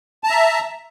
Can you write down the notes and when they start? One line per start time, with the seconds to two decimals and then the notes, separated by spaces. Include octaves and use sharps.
0.24 A5
0.27 A#5
0.30 E5